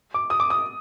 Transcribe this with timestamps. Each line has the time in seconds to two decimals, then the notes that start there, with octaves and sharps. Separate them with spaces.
0.14 D6
0.30 D#6
0.40 D6
0.50 D#6